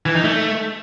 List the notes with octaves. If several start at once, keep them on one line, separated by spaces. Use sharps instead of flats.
E3
D#4
A3